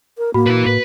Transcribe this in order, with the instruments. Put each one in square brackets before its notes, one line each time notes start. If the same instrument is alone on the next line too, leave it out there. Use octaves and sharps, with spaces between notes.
[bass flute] A#4
[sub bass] A2 [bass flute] A#3 [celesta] F#4 B5
[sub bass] A#2 [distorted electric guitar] E4 B4
[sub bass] A2 [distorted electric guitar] B4